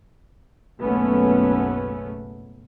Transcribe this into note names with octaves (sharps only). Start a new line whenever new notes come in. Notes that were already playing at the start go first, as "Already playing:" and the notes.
F#1 B1 A3 B3 C#4